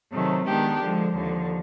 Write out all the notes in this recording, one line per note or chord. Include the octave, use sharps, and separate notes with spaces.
C3 D#3 F#3 A3
D#3 G#3 B3 D4 G4
D3 F3 G#3
D#2 D3 F3